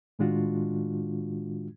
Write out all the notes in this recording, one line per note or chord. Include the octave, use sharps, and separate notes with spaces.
A2 D#3 G#3 D4 F4 F#4